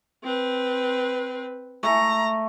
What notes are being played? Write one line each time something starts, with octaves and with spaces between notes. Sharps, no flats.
C4 B4
A3 A#5